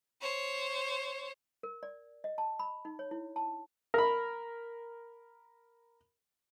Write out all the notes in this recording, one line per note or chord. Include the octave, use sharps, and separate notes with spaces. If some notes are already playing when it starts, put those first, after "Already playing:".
C5 C#5
A#4
D5
D#5
A5
B5
D#4
C#5
E4
A5
A#4 B5